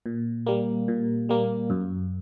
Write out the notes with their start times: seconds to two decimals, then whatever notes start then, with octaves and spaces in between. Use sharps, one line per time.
0.06 A#2
0.46 G3 A#3
0.88 A#2
1.29 G3 A#3
1.70 F#2